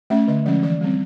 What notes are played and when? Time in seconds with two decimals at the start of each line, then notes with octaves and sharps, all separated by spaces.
0.10 A3 C#4 E5
0.28 D3 D#5
0.46 F3 G#3 C#4 D5
0.63 E3 D5
0.81 G3 C4